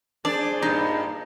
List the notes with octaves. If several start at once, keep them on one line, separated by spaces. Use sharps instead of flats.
D4 G#4 C5 D5
G2 A#2 D#4